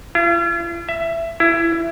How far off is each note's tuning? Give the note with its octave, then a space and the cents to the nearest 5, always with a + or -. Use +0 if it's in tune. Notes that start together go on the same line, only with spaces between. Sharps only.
F4 -45
E5 +15
E4 +20